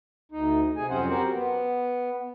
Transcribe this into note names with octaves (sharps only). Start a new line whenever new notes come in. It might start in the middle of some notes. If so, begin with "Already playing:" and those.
D2 D#4
C3 G#4 G#5
F2 F#3 C4 C#4 C5 F#5
F#4 G4 A#4 C5 F#5
B3